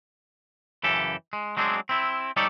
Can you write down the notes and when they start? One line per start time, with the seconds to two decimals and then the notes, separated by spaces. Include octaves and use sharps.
0.83 F#2 C#3 E3 G4 A4
1.33 G#3
1.57 F#3 G#3 C4 D4 F#4 G#4
1.89 C4 E4
2.36 G3 D#4 G4 A4 C#5 D5